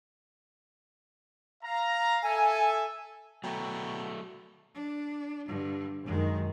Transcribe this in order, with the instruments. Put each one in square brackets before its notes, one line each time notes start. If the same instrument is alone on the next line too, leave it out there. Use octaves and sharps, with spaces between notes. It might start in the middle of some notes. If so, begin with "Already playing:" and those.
[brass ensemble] F5 A#5
[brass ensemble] A4 E5 [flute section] G#5
[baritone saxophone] B2 [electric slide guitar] F#3 A3 [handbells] G5 A#5 C#6
[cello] D4
G2 D3
[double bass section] F#2 D#3 [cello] G#3